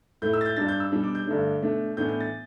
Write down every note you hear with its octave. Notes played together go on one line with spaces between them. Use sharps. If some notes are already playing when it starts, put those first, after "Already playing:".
A2 A3 E4 G6
E6
A6
G6
G2 G3 D4 A6
G6
E6
B2 G3 D4
D6
G6
G2 D3 A3 D4
B2 A3 D4
A2 E3 B3 D4 G6
G6
A6